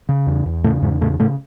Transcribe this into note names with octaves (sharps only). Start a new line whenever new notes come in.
C#3
E2
E2
A2 C#3 A3
E2 G#2 G#3
A2 C#3 A3
A2 C#3 A3